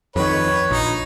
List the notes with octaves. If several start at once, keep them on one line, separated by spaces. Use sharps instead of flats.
F2 D#3 B4 C#5
A#1 D#4